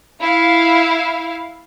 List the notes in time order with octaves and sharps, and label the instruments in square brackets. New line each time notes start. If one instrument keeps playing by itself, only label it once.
[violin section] E4 F5